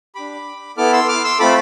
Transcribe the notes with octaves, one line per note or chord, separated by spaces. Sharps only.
D4 G4 B5 D6
B3 E4 A4 D6 F6
C6 E6
D6 F6
C6 E6
A3 C4 F4 A4 B5 D6